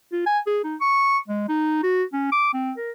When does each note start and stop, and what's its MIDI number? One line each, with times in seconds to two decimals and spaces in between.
0.13 0.23 65
0.26 0.39 80
0.47 0.60 68
0.64 0.76 63
0.81 1.18 85
1.28 1.48 56
1.49 1.82 63
1.83 2.03 66
2.13 2.32 61
2.32 2.54 86
2.54 2.72 60
2.77 2.91 70